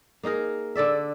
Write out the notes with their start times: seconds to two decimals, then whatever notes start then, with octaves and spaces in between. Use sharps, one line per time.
0.23 A#3 D#4 G#4 A#4
0.75 D3 A4 D5 E5